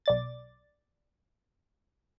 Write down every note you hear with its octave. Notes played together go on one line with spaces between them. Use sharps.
B1 D5 A6